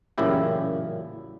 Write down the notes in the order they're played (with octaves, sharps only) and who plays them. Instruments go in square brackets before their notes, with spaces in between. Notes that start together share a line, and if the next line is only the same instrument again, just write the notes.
[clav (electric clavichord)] A1 F#2 A#2 C#3 E4 G4